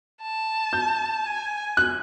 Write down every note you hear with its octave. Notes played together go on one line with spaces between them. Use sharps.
A5
G6
G#5
F#6